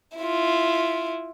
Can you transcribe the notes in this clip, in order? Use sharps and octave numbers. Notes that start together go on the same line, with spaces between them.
E4 F4